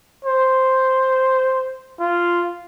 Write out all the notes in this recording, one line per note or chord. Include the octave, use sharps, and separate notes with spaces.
C5
F4